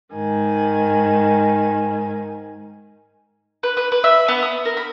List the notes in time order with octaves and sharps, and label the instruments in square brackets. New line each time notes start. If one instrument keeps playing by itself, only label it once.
[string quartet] G#2 D#3 G#5
[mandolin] B4
B4
B4
E5
B3
D#6
A#4
B5